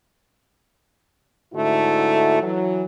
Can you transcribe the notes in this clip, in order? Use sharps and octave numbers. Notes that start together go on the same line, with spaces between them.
G#2 D3 A3 E4 F#4
E3 F#3